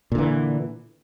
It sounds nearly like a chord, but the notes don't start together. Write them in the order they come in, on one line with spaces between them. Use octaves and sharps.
A#2 D3 E3